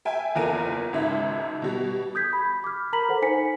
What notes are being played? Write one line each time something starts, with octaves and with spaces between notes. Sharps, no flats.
E5 G5 G#5
F#1 E2 F4 A#4 D#7
G#1 C#2 G#2 C#3 E5
B2 G3
D#6 G6 G#6 B6
B5
D6 F6
A#4 A#5 B5 B6 F#7
A4 C5 F#5
D#4 C5 G#5 B6 C#7